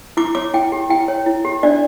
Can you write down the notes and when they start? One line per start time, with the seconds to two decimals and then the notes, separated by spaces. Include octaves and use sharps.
0.17 E4 D6
0.35 C#5 D6
0.54 E4 G5
0.72 G4
0.90 E4 G5
1.08 C#5
1.26 E4
1.45 G4
1.63 D4 D5